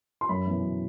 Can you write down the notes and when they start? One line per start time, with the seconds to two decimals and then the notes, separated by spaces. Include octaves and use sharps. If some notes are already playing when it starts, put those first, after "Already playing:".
0.21 C6
0.29 F#2 B5
0.47 E3 B3
0.63 F#2